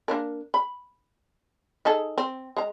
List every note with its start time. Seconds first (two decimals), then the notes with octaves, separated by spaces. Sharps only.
0.08 A#3 D4 A#4
0.54 B5
1.85 D#4 G#4 A4
2.18 C4
2.57 G#3 A#5